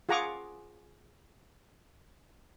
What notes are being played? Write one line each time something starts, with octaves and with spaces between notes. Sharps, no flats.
F4 G#4 F#5 A#5 C#6 D6